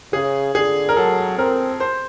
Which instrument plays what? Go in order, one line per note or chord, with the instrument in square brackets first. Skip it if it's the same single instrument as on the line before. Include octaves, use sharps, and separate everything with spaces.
[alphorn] C#3 [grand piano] G#4
[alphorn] D3 [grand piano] G#4
[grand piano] A#4
[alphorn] F#3 [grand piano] A4
[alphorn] C4 [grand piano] A#4
[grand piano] C5